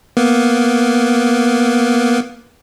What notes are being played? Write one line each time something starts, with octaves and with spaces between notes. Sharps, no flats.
A#3 B3